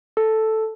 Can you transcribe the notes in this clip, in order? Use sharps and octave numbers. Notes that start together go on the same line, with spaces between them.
A4